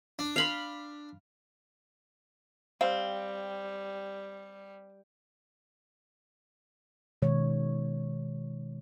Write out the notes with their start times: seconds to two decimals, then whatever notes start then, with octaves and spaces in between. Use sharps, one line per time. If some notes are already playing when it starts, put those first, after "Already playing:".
0.19 D4
0.36 F5 B5 C6
2.81 G3 C4 F5
7.22 B2 D#3 G#3 C#5